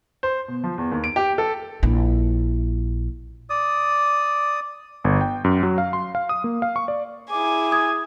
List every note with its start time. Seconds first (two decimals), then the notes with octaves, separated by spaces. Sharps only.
0.23 C5
0.48 B2
0.64 F3
0.78 E2
0.92 D#2
1.04 D7
1.16 G4
1.38 A4
1.83 A#1 E4
3.50 D5 D#6
5.04 G1
5.21 G5
5.44 F#2
5.63 F#3
5.78 F5
5.93 C6
6.15 F5
6.29 D#6
6.44 A#3
6.62 F5
6.76 C#6
6.88 D5
7.31 E4 G#4 G#5 D6
7.71 D#6 G#6